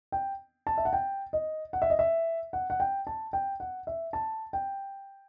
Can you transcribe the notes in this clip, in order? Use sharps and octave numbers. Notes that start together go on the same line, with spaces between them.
G5
A5
E5
F#5
G5
D#5
F#5
E5
D#5
E5
F#5
F#5
G5
A5
G5
F#5
E5
A5
G5